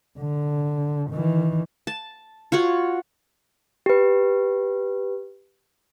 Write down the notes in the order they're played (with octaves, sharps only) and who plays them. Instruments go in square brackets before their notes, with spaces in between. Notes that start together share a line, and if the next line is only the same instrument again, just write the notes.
[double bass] D3
D#3 E3
[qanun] A5
F4 F#4 C#5 F#5
[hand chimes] G4 B4